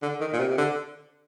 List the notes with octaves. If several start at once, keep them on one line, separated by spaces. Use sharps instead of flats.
D3
D#3
A#2
C3
C3
D3